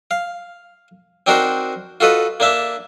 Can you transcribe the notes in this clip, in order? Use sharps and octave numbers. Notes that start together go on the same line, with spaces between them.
F5
C4 D4 D#4 F#4 A#4 C5
F4 F#4 A4 B4 D#5
A#3 D4 E5 A5